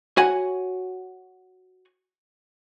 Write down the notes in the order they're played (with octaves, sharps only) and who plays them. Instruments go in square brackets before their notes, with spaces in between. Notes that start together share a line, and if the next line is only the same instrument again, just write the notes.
[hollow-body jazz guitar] F#4 C#5 F#5 G#5